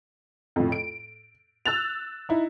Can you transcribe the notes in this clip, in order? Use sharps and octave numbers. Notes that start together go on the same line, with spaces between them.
F2 A2
D7
E6 F#6 A6 F7
D#4 E4